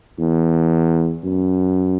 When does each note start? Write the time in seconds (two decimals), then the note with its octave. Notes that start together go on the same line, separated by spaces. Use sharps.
0.20 E2
1.25 F#2